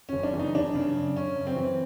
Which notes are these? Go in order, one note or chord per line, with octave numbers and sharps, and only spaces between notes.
F#1 C#4
D4
E3
D#4
F#1 D4
C#3
F#2
C#3 C#4
F#2
C4
E3